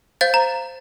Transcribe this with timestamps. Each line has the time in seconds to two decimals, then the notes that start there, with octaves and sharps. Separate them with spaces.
0.21 C5 F5 G6 A6
0.34 A#5